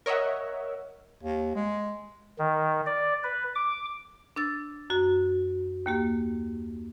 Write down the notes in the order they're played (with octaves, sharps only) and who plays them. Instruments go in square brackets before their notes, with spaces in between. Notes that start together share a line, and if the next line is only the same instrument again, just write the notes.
[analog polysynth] A#4 C#5 D#5 E5 F#5
[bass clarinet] D#2
G#3
[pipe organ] D#3
D5
B4
D6
[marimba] D4 E6 A6
F#2 F#4
D#2 A#3 G4